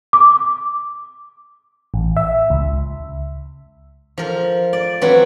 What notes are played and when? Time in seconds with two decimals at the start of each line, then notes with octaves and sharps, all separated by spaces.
0.13 D6
1.94 A1
2.17 E5
2.50 C#2
4.18 F3 A#4
4.73 D5
5.01 F#3 C4 F#4 B4